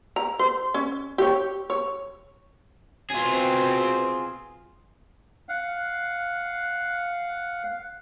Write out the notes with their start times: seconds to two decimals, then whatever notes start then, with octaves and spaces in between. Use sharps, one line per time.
0.16 A#5
0.39 C5
0.74 C#4
1.18 G4 C#5
1.70 C#5
3.10 B2 C4 F4 G#4
5.49 F5 F#5